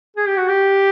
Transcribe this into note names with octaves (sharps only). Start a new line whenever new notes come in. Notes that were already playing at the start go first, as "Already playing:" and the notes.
G#4
G4
F#4
G4